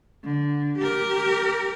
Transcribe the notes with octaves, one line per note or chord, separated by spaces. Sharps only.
D3
G4 A#4